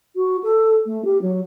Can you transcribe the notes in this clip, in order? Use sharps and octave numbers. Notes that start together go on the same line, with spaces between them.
F#4
A4
A3
G4
F#3